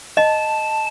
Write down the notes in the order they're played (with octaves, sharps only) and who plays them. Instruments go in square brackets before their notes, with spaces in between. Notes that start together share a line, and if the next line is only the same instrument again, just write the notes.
[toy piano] D#5 [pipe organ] A5